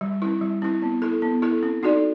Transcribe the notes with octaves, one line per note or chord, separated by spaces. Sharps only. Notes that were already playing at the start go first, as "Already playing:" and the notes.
G3
C4 E4
G3
C4 E4
B3
E4 A4
B3
E4 A4
C4
D#4 F#4 A4 D5